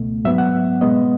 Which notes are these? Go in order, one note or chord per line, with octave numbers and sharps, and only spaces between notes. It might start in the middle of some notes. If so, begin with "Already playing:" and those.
Already playing: C#2 B2 A3
G#2 F#3 B3 E5
F#5
B2 G#3 B3 D#5